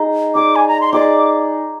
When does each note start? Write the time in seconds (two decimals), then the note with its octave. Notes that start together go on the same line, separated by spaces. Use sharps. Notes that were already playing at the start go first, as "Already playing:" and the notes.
Already playing: D#4 G#4 D#5
0.35 D#4 G#4 D5 D6
0.56 G#5
0.68 A#5
0.81 C6
0.93 D#4 G#4 D5 D6